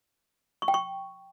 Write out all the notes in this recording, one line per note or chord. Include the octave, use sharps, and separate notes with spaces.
C#6
G5
C#6